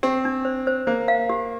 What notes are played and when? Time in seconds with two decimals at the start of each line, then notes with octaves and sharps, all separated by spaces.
0.03 C4 G4
0.25 D4
0.45 C5
0.67 C5
0.87 A#3 C5
1.08 F5
1.30 G4